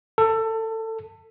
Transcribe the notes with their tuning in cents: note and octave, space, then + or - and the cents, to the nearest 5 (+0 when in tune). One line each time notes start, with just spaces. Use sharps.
A4 +20